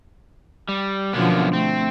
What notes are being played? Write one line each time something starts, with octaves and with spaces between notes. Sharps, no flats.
G3
F#2 B2 D3 F3 A#3 B3
A3 C4